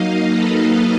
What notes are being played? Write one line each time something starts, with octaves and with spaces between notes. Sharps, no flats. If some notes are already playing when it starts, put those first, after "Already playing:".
Already playing: F#3 A#3 D#4 D#5 F5
A4 B4